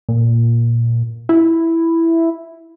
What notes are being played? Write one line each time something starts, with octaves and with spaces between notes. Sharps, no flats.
A#2
E4